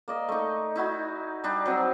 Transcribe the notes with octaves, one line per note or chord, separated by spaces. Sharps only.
A#3 D5 D#5
A3 D#4
D#4 E4 F#4 G#5
G3 D4 D#4
F#3 C4 D#4